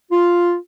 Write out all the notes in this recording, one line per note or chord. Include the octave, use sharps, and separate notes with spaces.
F4